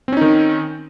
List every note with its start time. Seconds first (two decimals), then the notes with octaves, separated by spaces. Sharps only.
0.08 C4
0.12 C#4
0.17 D#4
0.21 D#3